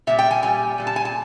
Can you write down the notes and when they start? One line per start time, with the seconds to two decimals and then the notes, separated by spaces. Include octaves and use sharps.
0.07 A#2 G3 E5
0.19 G5
0.31 G#5
0.42 A#2 G3 G#5
0.78 A#2 G3
0.87 A5
0.96 G#5
1.05 A5